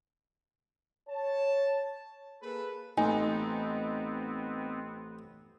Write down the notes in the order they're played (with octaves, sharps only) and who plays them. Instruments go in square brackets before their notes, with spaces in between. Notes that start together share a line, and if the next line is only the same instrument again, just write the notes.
[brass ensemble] C#5 A5
A#3 G#4 A4 B4
[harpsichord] A1 [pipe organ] B3 C4 [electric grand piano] D#4 [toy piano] G#5